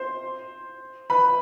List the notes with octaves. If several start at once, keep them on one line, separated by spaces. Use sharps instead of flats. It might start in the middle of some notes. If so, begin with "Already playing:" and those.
Already playing: C5 C6
B4 B5